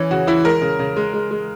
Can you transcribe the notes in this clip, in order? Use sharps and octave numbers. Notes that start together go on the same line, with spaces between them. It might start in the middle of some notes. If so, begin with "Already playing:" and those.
Already playing: E3 C#4
C#3 F#4
E3 E4
G#3 A#4
C#3
C#3
G#3
G#3
G#3